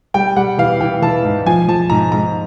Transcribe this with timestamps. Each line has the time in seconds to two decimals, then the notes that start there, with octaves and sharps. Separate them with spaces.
0.14 G3 G5
0.36 G3 F#5
0.58 E3 F5
0.80 E3 G5
1.02 E3 A5
1.24 G#2
1.46 F3 G#5
1.68 F3 A5
1.90 G#2 A#5
2.12 G#2 A#5